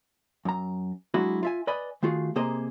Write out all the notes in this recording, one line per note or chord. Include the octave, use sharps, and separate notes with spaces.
F#2 A#5
F#3 G#3 D4 E4 F#4 G#4
F4 E5 G#5
B4 D5 D#5 G#5 B5
D#3 A3 F4 F#4 G#4
C3 A#3 G#4 C5 D#5 A#5